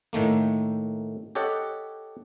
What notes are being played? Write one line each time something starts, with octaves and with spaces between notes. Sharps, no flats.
A2 D#3 A3 A#3
G4 A4 C#5 D#5 F#5